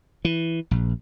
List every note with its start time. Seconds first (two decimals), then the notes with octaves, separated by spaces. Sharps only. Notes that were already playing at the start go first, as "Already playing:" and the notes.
0.25 E3
0.71 A#1